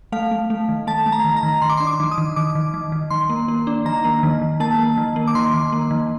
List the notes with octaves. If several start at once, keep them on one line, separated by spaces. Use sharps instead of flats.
A3 F5
A3
A3
D#3
A3 A5
A3
A#5
D#3
A#5
D#3
D#3 C6
D6
C6
D4
D6
D#3
D#6
D#3
D#3 D6
D#3
D#3
D#3
D#3 C6
A#3
A#3
D4
D#3 A#5
A#3
D#3
D#3
A#3 A5
A#3
D#3
A#3
D6
D#3 C6
D#3
A#3
D#3